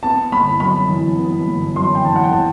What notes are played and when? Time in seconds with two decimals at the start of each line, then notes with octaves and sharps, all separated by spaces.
0.03 B3 A5
0.32 G1 B5
0.60 F#2 B5
0.89 E3
1.18 B3
1.47 G1
1.75 F#2 C6
1.95 G5
2.04 E3 A5
2.16 F#5
2.24 G5
2.33 A5